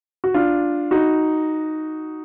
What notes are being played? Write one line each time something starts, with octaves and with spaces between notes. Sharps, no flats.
F#4
D4 F4
D#4 F#4